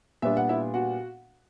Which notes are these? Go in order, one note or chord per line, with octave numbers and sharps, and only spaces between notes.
A#2 G3 B3 D4 E5
F#5
E4 E5
F#4 F#5